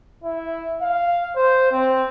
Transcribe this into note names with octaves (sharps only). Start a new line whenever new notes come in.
E4
F5
C5
C4